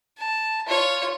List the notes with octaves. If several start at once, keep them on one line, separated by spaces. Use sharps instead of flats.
A5
F4 C#5